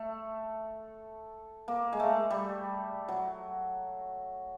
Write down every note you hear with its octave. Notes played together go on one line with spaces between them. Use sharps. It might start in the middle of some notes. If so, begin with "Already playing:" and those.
Already playing: A3
A#3
G#3
A3
G3
F#3